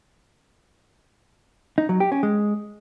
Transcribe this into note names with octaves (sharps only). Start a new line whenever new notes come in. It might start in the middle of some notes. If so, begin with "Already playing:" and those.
D#4
F#3
G4
C#4
G#3